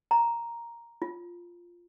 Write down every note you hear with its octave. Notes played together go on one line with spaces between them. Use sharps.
A#5
F4